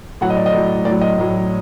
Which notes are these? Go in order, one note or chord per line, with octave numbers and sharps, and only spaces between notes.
A2 F#3 F#5
D#5
D5
D#5
A2 F#3
A2 F#3 D5
D#5
A2 F#3